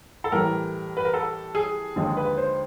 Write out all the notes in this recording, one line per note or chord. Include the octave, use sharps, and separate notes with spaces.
A4
A2 E3 G3 A#4
B4
A#4
A4
G#4
D#2 D3 F3 G#3
B4
C5